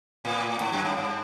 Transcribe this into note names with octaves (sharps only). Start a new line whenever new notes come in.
A2
G#2
F#2
G2
G2